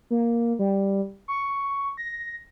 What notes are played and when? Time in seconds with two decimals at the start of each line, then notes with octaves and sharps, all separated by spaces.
0.10 A#3
0.59 G3
1.28 C#6
1.97 A#6